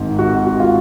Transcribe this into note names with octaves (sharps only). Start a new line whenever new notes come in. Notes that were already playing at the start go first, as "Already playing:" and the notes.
Already playing: G#1 G#2 D#3
F#4
F#4
F4